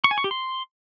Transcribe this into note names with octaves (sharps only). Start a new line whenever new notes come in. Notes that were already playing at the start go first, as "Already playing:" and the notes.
C#6
G#5
C#6
G4
C6